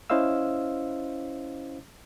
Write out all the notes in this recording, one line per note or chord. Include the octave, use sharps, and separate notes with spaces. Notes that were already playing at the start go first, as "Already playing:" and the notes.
C#4 E4 C5 D#5 F5 E6